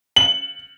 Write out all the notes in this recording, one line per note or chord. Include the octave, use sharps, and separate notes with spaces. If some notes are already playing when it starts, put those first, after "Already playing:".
F#7